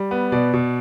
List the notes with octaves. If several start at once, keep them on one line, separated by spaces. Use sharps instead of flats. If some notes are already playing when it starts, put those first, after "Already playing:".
Already playing: G3
B3
B2 D5
B2